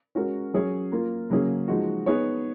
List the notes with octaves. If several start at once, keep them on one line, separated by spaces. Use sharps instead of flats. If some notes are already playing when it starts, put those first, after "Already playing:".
G#3 C#4 F#4 A#4
F#3 C#4 G#4 C#5
A#3 F4 A#4
C#3 F#3 A#3 C#4 G#4
F3 G#3 D#4 F#4
B3 D#4 G#4 C#5